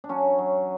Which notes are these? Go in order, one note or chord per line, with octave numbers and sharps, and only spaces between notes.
D4
F#3 C#4
F#3